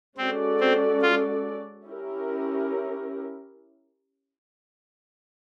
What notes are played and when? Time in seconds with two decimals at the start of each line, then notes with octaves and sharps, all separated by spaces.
0.18 G#3 C4 C#4 F#4 A4 D5
0.61 C4
1.02 F4
1.86 C#4 E4 G4 A#4